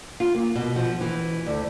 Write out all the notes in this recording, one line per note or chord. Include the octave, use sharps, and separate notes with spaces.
F4
A#3
B2
F3
E3
D2